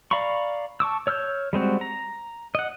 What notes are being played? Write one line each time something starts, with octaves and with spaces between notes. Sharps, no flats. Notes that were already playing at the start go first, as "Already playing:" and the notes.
D5 F5 A#5 B5 C#6
A5 C#6 D6 E6
C#5 E6 F6 G6
G3 G#3 C4 F#4
A#5
D#5 F#5